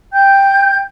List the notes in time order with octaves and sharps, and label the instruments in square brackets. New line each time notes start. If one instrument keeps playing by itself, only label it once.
[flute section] G5 G6